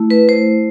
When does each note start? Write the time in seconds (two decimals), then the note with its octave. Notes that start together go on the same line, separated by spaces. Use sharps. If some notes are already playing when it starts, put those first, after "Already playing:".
Already playing: A3 E4
0.10 B4
0.29 C5